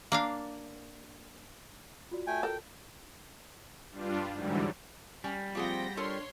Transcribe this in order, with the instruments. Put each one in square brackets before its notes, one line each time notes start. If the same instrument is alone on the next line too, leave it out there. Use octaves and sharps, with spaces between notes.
[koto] A#3 D4 F5
[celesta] F4 F#4 D5
[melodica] A3 G5 G#5
[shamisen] A4 A#4 [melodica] G5
[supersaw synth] G2 G3 D4 F4
G#2 D3 E3 F#3 G3
[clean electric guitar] G3 [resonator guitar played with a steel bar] C#4
[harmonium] F3 C4 F4 [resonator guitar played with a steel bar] A#3 G#4 F#5 [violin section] G5 A#6
[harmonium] D4 [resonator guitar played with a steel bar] F4 A4 A#4 [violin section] C#5 C6